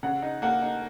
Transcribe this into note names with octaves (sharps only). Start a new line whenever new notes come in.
C#3 F#5
D#4
A#3 F#5
D#4